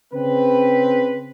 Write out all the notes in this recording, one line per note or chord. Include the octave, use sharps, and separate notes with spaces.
C#3 C4 B4